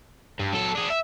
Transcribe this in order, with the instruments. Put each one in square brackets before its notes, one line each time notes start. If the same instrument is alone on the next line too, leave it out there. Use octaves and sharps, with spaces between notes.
[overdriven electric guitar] G2
F#3 A4
D4 G#4
E5